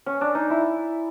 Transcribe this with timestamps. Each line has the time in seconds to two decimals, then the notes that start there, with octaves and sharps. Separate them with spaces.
0.06 C#4
0.21 D4
0.35 D#4
0.50 E4